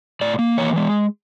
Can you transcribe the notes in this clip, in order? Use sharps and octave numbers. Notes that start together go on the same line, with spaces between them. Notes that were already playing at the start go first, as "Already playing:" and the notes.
A2 D5
A#3
E3 C#5
G#3